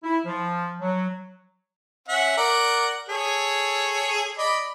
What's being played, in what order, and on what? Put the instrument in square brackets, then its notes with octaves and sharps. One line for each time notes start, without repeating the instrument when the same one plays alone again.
[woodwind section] E4
F3
F#3
[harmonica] C#4 E5 F#5
A#4 D5 F#5
G#4 A4 C#5
D5 D#5 B5